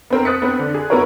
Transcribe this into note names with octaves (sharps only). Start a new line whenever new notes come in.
B3 C4 A#4
D#6 F#6 A6 B6 C#7
B3 C4
D3
G#4
B3 E4 F#4 A#4 B4 C#5